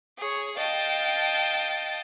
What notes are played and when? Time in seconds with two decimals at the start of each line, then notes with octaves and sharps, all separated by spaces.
0.19 G#4 C#5
0.58 D#5 F5 G5 A5